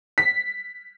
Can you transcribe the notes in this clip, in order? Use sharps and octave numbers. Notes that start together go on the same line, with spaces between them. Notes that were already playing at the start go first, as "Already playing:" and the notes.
B6